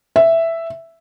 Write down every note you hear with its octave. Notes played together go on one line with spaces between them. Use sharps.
E5